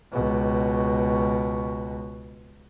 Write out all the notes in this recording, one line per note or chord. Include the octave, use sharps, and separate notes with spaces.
C#2 B2